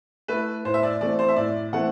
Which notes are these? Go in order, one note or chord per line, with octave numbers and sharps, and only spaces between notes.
A3 E4 B4
A2 C5
E5
D5
E3 A3 C4 D5
C5
E5
A2 D5
E3 A3 C4 F#5